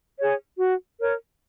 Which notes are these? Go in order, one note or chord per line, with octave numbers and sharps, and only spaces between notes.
G#4 C#5
F#4
A#4 C#5